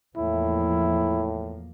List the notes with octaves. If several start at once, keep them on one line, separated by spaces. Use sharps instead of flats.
E2 A2 F3 A#3 E4